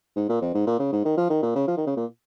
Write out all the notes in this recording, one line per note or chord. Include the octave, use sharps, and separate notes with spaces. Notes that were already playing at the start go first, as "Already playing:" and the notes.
G#2
A#2
F2
G#2
A#2
C#3
G#2
D#3
F3
D#3
A#2
C#3
F3
D#3
C#3
A#2